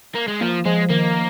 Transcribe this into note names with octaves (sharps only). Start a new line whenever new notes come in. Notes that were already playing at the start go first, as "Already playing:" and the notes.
A#3
G#3
F3 A#3
F3 G#3
D#3 A#3